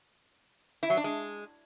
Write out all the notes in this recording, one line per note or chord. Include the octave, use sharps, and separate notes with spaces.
E4
F#3
D4
G#3